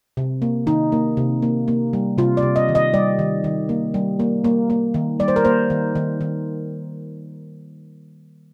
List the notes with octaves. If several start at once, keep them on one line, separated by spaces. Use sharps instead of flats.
C3
A#3
D#3 D#4
A#3
C3
A#3
A#3
G3
C3 F4
D5
C3
D#5
D#3
D#5
G3 D5
D#3
D#3
A#3
G3
A#3
A#3
A#3
D#3
G3 D5
C5
A#4
A#3 C5
D#3
D#3
D#3